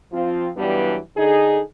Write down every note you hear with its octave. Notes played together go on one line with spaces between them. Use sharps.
F3 C4 F4
G2 E3 F#3 G3 B3 D4
D3 D#4 G#4